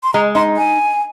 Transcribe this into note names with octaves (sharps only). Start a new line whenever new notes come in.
C6
G#3 A#5
D#4 C6
G#5